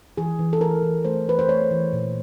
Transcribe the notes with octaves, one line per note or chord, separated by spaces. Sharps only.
E3 G#4
E3
A4
E3 A#4
E3
A3 C5
E3 B4
C5
A3 C#5
E3
A#2